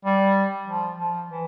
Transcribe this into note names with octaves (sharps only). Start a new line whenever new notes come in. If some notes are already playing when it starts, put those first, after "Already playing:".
G3
F3
F3
E3